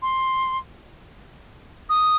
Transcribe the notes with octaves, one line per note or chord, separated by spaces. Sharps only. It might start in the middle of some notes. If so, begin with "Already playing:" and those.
C6
D#6